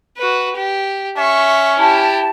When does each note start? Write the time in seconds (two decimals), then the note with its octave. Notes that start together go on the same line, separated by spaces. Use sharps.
0.17 F#4 B4
0.56 G4
1.17 C#4 E5 C#6
1.78 E4 G4 A5